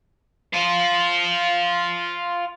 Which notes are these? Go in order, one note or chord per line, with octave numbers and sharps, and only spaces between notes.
F4 C5